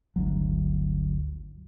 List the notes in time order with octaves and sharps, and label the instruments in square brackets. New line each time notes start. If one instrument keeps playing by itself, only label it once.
[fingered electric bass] G1 D2 F#3